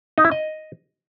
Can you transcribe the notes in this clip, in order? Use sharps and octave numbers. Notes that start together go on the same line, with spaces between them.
D#4
E4
D#5